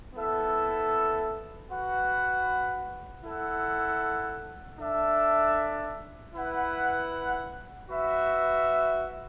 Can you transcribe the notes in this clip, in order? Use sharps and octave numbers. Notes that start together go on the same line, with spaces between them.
B3 E4 A4 E5
F#4 B4 F#5
E4 A4 F#5
D4 A4 E5
E4 B4 F#5
F#4 B4 E5